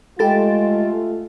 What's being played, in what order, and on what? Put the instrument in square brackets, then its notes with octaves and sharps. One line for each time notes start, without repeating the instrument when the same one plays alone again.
[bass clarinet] G#3 [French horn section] A3 F4 [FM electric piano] G4 A4 A6 [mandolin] G5 B5